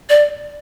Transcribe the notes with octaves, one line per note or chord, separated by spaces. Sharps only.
D5